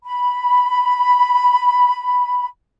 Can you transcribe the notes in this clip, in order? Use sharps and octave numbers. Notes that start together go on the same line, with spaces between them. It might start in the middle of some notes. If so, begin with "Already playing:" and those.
B5